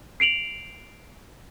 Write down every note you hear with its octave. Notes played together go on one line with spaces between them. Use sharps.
C7 D7 F7 F#7